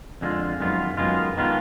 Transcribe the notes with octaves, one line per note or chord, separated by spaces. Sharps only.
F2 D3 G#3 D4 F4
F#2 D#3 G#3 B3 F4
F#2 D#3 G#3 B3 F4
D#3 G#3 B3 F4